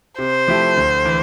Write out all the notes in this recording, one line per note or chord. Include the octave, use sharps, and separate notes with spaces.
C3 C5
F3 A3 E4 G4
D2
E3